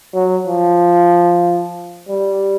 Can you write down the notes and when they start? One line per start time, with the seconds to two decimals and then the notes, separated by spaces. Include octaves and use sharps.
0.14 F#3
0.47 F3
2.09 G3